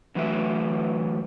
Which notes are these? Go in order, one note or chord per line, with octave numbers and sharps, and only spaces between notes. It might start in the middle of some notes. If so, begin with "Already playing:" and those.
D3 E3 F#3 A3 B4 E5